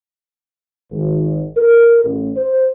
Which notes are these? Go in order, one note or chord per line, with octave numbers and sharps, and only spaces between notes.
G#1
A#4
A1
C5